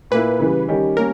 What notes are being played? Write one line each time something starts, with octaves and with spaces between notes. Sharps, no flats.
A#2 A#3 E4 B4
C#3 E3 G3
D#3 G3 C#4 G4
G3 A#3 C#4 A#4